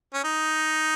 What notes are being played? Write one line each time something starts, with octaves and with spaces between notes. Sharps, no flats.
C#4
D#4